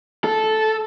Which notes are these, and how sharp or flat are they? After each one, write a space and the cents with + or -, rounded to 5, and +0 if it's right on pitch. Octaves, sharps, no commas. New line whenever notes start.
A4 -10